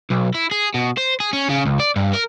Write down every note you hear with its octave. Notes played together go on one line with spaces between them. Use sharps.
B1
E4
G#4
B2
C5
G#4
C#4
C#3
C#2
D5
G2
A#4